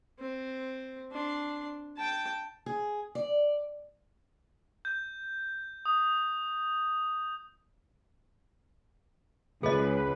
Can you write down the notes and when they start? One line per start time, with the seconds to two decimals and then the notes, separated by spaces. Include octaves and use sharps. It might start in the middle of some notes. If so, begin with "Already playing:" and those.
0.19 C4
1.11 D4 C6
1.97 G5 A5
2.66 G#4
3.15 D5
4.85 G6
5.85 D#6
9.63 C#2 G#4 B4 D#5